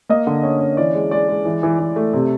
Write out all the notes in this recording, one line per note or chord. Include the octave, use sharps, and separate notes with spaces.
A#3 D#5
D3
C#4
C#4
E3 D5
G#3
G#3 D5
G#3
E3
E3
E3
A3
C3